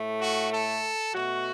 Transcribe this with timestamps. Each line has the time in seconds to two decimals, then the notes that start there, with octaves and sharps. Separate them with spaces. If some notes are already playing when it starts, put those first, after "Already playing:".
Already playing: A2 A3
0.20 F#4
0.51 A4
1.13 B2 A3 F#4